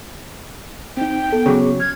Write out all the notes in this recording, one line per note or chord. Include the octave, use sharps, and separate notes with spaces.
C4 D#4 G5
B3 A4
C#3 F#3 G#4 D6
F6 G#6